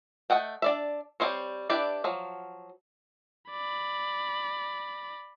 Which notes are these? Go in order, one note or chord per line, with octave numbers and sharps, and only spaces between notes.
A3 D#5 F#5 G5
D4 D5 E5
G3 C4 E4 C5 C#5
D4 E4 G4 B4 D5
F3 F#3
D5 B5